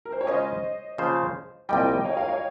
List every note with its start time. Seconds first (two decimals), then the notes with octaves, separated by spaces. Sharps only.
0.05 A#4
0.12 C5
0.21 C#5
0.27 C#3 G#3 C#4 F4 C5 D#5
0.98 C#3 F3 A#3 F4 C5
1.69 C2 A#2 G3 D#5 G5
2.04 C#5 F5
2.17 C#5 F5
2.29 C#5 F5